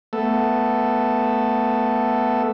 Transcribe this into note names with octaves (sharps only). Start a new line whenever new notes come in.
A3 B3 A4